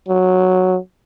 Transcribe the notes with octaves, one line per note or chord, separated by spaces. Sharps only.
F#3